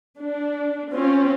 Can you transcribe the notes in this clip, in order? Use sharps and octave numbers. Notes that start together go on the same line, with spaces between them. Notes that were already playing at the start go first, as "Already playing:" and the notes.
D4
C4 C#4 F4